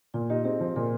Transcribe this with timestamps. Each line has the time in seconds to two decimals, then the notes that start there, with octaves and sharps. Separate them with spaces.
0.14 A#2 F4
0.30 D#4 G4
0.45 C4 G#4
0.61 F3
0.76 A#2 A#4